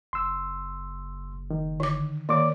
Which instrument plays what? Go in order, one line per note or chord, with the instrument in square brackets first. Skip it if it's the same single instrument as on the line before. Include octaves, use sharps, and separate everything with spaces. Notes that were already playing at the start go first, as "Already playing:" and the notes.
[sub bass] F#1 [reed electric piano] C6 E6
[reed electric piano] D#3
[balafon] D3 D6
[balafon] D#3 [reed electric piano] A#3 D5 D6